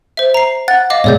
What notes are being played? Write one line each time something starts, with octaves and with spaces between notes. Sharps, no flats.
C5 E5
A#5 C7
F#5 A6
D#5 F5 D6
G#2 B2 G#3 C#5 D5 G6